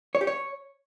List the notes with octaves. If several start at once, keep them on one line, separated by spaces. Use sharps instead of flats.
C#5
G4
C#5